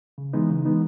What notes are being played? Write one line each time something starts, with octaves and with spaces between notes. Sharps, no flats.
C#3
E3 G#3 B3 D#4
C#3
E3 G#3 B3 D#4